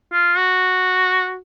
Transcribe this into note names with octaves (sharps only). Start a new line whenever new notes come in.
F4
F#4